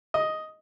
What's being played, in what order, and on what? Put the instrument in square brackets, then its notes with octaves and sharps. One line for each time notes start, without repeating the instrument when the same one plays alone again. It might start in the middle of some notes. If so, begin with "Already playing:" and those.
[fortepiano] D#5